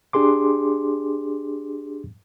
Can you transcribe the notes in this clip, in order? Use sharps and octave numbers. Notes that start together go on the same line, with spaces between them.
D4 G4 G#4 C6 D6